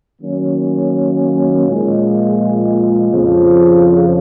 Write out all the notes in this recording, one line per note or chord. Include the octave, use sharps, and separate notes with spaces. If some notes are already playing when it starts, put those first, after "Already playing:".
D#3 F#3 A#3 C#4
A#2 F3 G#3
F2 C#3 F3